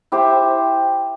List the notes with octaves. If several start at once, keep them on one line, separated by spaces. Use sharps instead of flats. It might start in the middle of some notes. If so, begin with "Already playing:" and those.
E4 G4 C5 E5